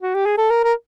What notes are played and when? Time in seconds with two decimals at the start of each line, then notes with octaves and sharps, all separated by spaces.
0.02 F#4
0.14 G4
0.26 G#4
0.37 A4
0.50 A#4
0.64 A#4